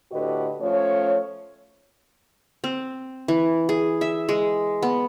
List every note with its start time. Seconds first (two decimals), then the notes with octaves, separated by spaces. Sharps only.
0.12 A2 D3 F#4 G4 B4 D#5
0.61 F3 A3 C#4 C#5
2.64 C4
3.28 E3
3.69 G#4
4.01 E5
4.29 G#3
4.82 B3